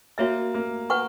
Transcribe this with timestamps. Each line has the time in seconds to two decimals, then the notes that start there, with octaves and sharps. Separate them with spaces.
0.18 A#3 F#4 C#5 E5
0.54 A#3
0.90 B4 F#5 C#6